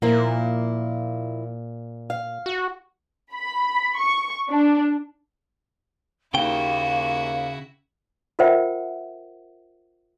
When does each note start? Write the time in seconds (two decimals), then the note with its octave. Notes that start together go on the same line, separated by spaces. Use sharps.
0.02 A#2 F3 A#3 E4
2.10 F5
2.46 F#4
3.33 B5
3.97 C#6
4.49 D4
6.34 D#2 C#3 E4 F#4 F5 G5
8.39 F4 A#4 C5 E5 F#5 G5